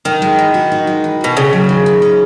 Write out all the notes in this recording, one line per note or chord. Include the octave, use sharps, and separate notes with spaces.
D#3 D#4
G#3
E3
F#4
D#4
G#3
E3
B2 F#4
C#3 C#4
F#3
D#3
D#3
C#4